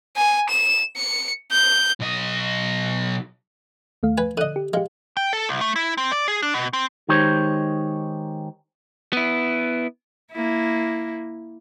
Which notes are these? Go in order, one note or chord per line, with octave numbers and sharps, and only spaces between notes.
G#5
E7
C#7
G6
B1 D#5
D#2 A3 F5
B4 G#5
D3 D#5 F#6 D#7
G4
G#3 G4 F5
G5
A4
C2
A3
E4
C4
D5
G#4
D4
B2
C4
D#3 G#3 D#4 G4 C5 C#5
B3 E4
A#3 E4